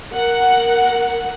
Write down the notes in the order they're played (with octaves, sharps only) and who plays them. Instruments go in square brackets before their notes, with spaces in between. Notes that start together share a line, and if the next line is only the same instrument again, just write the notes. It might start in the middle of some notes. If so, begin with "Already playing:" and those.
[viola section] A#4 F#5